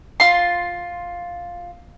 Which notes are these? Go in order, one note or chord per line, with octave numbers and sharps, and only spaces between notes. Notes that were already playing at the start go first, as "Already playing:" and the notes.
F4 C6